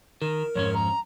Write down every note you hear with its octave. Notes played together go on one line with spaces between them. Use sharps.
D#3 A#4
F2 G#2 C#4 C#5
A#5